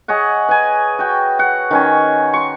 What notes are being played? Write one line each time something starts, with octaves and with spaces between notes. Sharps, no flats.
G#4 C#5 D#5 F#5
B4 G#5
F#4 G5
F#5
D#3 C#4 G#5
C6 C#6